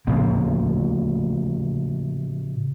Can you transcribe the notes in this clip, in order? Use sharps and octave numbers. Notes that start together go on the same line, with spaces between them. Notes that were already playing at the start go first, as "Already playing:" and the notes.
A2 C#3 F3 A#3